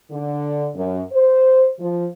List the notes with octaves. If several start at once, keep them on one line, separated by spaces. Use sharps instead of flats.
D3
F#2
C5
F3